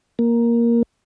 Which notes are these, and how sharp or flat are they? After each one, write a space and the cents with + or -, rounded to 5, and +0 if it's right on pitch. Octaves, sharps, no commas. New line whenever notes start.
A#3 +5